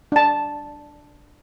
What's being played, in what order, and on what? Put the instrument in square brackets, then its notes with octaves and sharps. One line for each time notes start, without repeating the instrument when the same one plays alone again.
[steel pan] D4 A5